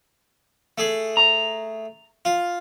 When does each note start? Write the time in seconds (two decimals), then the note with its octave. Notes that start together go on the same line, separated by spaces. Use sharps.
0.78 A3 G#4
1.17 A#5
2.25 F4